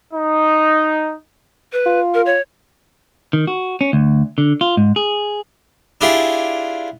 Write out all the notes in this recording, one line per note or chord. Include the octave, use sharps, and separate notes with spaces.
D#4
B4
F4
A#4
C#5
D#3
F#4
C#4
D2
D3
F4
G#2
G#4
D4 E4 F4 G4 G#4